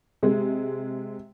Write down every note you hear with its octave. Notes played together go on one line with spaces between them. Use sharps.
C3 G#3